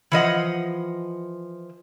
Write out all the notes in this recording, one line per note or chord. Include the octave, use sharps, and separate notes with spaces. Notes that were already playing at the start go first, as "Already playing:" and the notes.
E3 F3 D#5 F#5